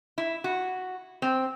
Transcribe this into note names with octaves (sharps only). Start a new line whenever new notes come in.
E4
F#4
C4